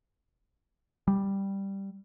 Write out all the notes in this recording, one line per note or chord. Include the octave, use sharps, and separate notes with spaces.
G3